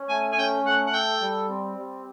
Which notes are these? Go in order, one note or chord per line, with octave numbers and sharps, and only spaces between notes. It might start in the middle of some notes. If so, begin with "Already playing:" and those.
Already playing: C#4
A3 G#5
G#5
C#4 G5
A3 F#5
F#5
A4 G5
G3
C4
G3